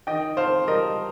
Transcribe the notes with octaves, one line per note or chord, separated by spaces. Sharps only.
D#3 D#5 G5
F2 C5 F5
G3 A#4 D#5